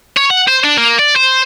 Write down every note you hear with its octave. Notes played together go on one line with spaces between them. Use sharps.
C#5
F#5
C5
D4
A#3
D5
C5